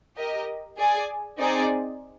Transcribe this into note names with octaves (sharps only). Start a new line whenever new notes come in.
G4 A#4 D#5
G#4 D5 G#5
C4 D#4 G#4 D5